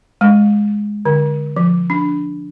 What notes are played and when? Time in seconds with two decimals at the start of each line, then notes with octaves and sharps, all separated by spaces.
0.21 G#3
1.05 D3
1.56 F3
1.90 D4